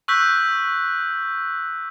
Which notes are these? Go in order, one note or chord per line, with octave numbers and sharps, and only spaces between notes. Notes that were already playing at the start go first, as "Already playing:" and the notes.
C#6 E6 F#6 G6 B6